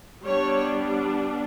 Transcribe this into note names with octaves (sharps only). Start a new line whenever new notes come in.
G3 B3 D4 C#5